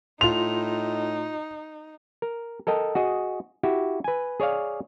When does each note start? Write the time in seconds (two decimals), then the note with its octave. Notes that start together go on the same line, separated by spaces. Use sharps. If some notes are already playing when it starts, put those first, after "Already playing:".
0.21 A2 D#4 F4 C6 F7
2.22 A#4
2.67 A4 A#4 D#5 G5 A5
2.95 F#4 G#4 D#5
3.63 E4 F#4 G4
4.04 B4 G#5
4.40 G#4 C#5 D5 F5